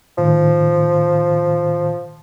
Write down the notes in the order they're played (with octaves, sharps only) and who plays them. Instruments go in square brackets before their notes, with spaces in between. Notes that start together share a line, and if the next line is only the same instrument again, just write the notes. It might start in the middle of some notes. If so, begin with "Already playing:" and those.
[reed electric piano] A2 D#3 [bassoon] F3